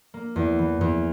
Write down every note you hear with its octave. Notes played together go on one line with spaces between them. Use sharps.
A#3
E2
E3
E2